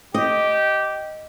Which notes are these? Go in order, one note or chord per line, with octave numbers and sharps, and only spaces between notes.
G4 D#5